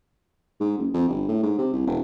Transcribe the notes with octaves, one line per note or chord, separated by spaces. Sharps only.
G#2
F#1
F2
G1
A2
G#2
C3
C2
E1